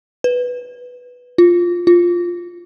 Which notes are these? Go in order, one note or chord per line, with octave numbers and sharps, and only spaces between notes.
B4
F4
F4